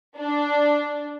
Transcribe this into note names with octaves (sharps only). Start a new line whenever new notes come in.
D4